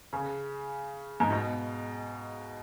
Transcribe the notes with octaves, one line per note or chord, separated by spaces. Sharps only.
C#3
G#2
B2